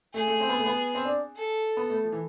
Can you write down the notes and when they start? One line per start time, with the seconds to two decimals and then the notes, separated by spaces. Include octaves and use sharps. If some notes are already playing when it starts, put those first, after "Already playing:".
0.13 A3 G#4
0.28 A3
0.40 C4
0.49 B3
0.58 A3
0.66 B3
0.95 C4
1.05 D4
1.35 A4
1.77 B3
1.90 A3
2.04 F3
2.12 E3